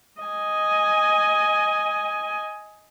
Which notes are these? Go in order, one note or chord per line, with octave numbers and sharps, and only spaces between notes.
D#5 G#5